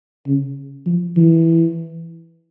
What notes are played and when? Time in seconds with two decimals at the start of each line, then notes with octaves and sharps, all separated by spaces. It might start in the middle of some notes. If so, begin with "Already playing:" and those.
0.27 C#3
0.86 F3
1.17 E3